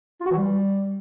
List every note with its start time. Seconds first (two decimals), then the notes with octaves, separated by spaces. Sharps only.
0.20 F4
0.26 F#4
0.31 E3
0.37 G3